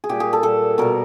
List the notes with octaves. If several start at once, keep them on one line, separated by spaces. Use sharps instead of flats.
G#4
A#2 G3 G4
G#4
A4
A#2 G3 A4
B2 G3 A#4